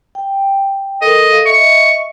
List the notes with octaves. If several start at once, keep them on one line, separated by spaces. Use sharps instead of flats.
G5
A4 A#4 D#5
A4 F5
D#5 E5 C#6